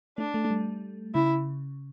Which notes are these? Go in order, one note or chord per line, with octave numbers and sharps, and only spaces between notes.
A3 D4
A3
A3
G3
C#3 E4